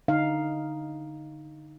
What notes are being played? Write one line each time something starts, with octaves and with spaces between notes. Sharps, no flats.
D3 D#4 F5